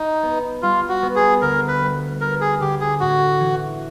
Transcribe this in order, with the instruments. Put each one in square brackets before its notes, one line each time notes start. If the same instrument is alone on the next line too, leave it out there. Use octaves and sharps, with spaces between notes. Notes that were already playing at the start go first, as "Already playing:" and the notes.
Already playing: [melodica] D#4
[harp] B3
[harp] G3 [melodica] F4
[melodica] F#4
[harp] B3
[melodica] G#4
[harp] D2 [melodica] A#4
[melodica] B4
[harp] G3
[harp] B3 [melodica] A#4
[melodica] G#4
[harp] D3 [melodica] G4
[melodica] G#4
[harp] A2 [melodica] F#4
[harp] E3